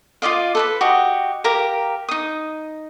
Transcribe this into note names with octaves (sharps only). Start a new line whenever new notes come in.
F4 D5 D#5 F5
A4 B4 B5
F#4 G4 D#5
G4 A#4 F5 A#5
D#4 D#6